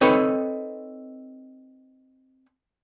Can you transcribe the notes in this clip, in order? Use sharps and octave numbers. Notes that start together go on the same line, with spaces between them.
C4 D#4 A4 B4 C#5